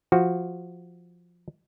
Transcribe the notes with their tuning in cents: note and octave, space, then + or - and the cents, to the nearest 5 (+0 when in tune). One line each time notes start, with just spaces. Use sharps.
F3 +0 F#4 +0